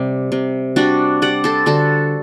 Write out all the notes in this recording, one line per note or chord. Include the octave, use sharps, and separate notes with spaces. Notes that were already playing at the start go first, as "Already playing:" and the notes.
Already playing: C3 G3
C3
G3 D4 F#4
G3 D5 F#5
A4 C5
D3 F#4 A4